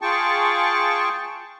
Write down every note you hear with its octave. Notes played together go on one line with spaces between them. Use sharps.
F4 G#4 G5 A5 C#6